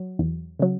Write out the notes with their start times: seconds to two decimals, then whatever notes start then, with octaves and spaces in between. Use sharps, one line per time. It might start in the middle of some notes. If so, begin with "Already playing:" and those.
Already playing: F#3
0.19 E2
0.59 C#3 F#3